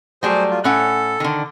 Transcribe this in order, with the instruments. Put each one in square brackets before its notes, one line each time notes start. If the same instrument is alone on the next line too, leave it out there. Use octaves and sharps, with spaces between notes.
[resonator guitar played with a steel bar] F#3 G3 A3 [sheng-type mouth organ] G#4 C5
[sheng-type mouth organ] F4
[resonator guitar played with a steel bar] A2 C#4 F#5 [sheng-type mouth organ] A4
[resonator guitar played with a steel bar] D3 D#3